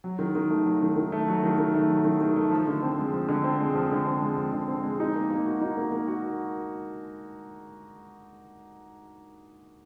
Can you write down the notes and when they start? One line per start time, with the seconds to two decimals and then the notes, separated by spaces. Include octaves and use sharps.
0.04 F#3
0.19 D#3
0.35 D#3
0.50 A3
0.66 F#3
0.82 D#3
0.96 D#3
1.12 A3
1.28 F#3
1.43 D#3
1.58 D#3
1.74 A3
1.90 F#3
2.05 D#3
2.21 D#3
2.36 A3
2.51 F3
2.67 D3
2.82 C4
2.98 G#3
3.13 F3
3.29 D3
3.44 C4
3.60 G#3
3.75 F3
3.91 D3
4.07 C4
4.21 G#3
4.38 F3
4.52 D3
4.68 C4
4.83 G#3
5.00 D#4
5.15 A#3
5.31 A#3
5.46 F#4
5.61 D#4
5.77 A#3
5.92 A#3
6.08 F#4